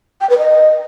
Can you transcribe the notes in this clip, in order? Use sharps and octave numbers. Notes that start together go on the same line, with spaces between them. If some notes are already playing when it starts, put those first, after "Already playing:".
G5
B4
D#5